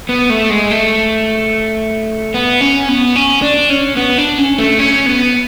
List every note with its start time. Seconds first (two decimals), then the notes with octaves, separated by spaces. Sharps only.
0.09 B3
0.30 A3
0.50 G#3
0.71 A3
2.34 B3
2.61 C#4
2.89 B3
3.16 C#4
3.42 D4
3.70 C#4
3.97 B3
4.18 D4
4.38 C#4
4.58 A3
4.79 C#4
5.06 B3